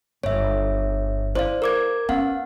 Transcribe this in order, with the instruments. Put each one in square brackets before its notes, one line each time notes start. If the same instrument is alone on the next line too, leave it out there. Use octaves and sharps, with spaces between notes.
[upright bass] G1 [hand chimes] C#5 E5
[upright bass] E4 [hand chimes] C5 D5 F5
[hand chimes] A#4 D6 G#6
[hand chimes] B3 F5 F#5 [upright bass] C#4